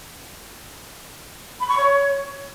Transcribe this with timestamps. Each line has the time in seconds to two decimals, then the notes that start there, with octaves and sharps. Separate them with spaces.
1.60 B5
1.69 C#6
1.78 C#5